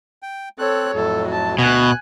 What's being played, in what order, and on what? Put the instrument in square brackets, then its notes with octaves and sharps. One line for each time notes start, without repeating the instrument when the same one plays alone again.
[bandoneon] G5
[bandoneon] C4 F#6 [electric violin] A4 C#5
[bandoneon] F2 A2 F#3 [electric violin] A4
[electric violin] F#4 A5
[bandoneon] D2 B3 F#5 [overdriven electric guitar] B2 [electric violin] G#5 F#6